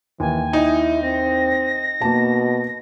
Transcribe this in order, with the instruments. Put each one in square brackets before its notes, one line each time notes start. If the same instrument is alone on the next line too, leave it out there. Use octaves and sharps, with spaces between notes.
[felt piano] D#2 [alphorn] E3 [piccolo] G#5
[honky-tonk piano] D#4 [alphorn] E4
[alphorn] C4 [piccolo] A#6
[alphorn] B2 [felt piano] A#3 A5